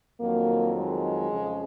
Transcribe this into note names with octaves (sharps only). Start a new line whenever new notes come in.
F2 D#3 F#3 A#3
G#3
F2 C#3 F3